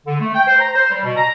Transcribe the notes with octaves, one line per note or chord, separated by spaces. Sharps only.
D3
A3
G5
C5
A#5
C5
G3
B2
A#5